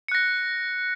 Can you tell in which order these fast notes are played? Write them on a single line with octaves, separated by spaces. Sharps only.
C#7 F#6 A#6